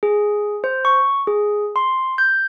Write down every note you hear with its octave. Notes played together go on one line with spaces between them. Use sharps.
G#4
C5
C#6
G#4
C6
G6